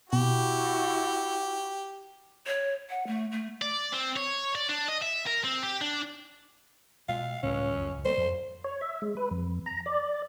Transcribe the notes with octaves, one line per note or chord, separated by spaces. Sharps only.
B2 E4 F#4 G4
C#5
F#5
A3
A3
D5
C4
C#5
D5
D4
D#5
E5
A#4
C4
G4
D4
B2 G#3 F5
C#2 A2 G3 C#4
C#2 F#2 F3
C#2
G3 A#3 B3 C5
F2 F3 F#3
C#5
E5
G#3
B4
F2
A#5
D5